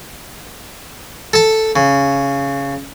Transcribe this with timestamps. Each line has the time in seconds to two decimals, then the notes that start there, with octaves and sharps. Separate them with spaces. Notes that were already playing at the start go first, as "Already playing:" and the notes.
1.33 A4 A5
1.76 C#3